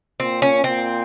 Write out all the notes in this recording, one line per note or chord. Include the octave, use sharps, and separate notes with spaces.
A#2 C4
C#4
A#2 C4